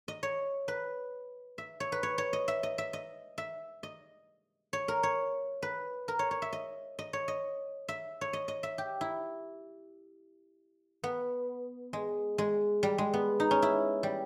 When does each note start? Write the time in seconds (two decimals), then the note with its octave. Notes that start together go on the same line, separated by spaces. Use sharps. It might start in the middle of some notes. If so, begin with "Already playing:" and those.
0.08 D#5
0.23 C#5
0.68 B4
1.58 E5
1.80 C#5
1.92 B4
2.03 C#5
2.18 C#5
2.33 D#5
2.48 E5
2.63 D#5
2.78 E5
2.93 D#5
3.38 E5
3.83 D#5
4.73 C#5
4.88 A#4
5.03 C#5
5.62 B4
6.08 A#4
6.19 C#5
6.31 C#5
6.42 E5
6.53 D#5
6.99 D#5
7.13 C#5
7.28 D#5
7.88 E5
8.21 C#5
8.33 D#5
8.48 D#5
8.63 E5
8.78 G4
9.01 E4
11.04 B3
11.93 G#3
12.38 G#3
12.83 G3
12.98 G#3
13.14 B3
13.40 D#4
13.51 C#4
13.62 E4
14.03 G3